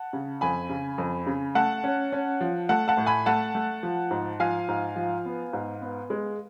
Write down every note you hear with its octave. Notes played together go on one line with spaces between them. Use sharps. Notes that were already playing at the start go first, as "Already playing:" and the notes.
Already playing: F#5 A5
C#3
F2 G#5 B5
C#3
F2
C#3
A3 F#5 A5
C#4
C#4
F3
A3 F#5 A5
F#5 A5
A2
G#5 B5
A3 F#5 A5
A3
F3
G#2
F3 F5 G#5
G#2
F3
B3
G#2
B3
G#3